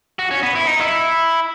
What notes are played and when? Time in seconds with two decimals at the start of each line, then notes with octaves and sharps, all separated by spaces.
0.19 F#4
0.31 C#4
0.43 B3
0.55 E4
0.67 D#4
0.80 E4